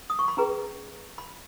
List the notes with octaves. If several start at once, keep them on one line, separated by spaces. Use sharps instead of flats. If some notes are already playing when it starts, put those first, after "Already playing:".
D#6
C#6
B5
C#4 G#4 B4 A#5
B5